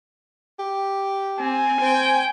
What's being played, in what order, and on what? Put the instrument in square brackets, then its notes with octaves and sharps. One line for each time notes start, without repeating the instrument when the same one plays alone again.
[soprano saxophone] G4
[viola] C4 [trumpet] G#5
[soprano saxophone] C4 [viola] G5